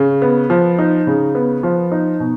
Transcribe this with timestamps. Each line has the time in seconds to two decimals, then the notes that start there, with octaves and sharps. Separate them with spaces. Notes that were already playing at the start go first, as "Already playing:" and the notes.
Already playing: C#3
0.22 B3
0.50 F3
0.79 D#4
1.07 C#3
1.35 B3
1.63 F3
1.92 D#4
2.20 B2